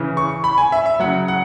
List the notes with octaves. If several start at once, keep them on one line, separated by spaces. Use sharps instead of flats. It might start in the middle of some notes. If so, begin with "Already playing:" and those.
Already playing: C#3 E3
C#6
B5
G#5
E5
E5
C#3 F#3 F#5
F#5